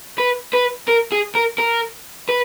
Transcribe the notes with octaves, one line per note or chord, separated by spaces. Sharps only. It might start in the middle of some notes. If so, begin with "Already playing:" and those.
B4
B4
A#4
G#4
A#4
A#4
B4